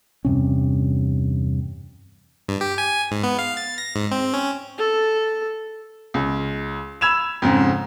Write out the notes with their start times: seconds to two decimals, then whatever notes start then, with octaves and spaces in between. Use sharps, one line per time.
0.25 E2 G2 C3 C#4
2.49 G2
2.61 G4
2.78 G#5
3.11 G#2
3.24 B3
3.39 F5
3.57 A6
3.78 A#6
3.96 G#2
4.11 C4
4.34 C#4
4.78 A4
6.14 C#2
7.01 B5 E6 G#6 E7 F7
7.42 F2 G#2 C#3